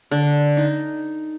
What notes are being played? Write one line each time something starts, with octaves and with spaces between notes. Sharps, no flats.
D3
D#4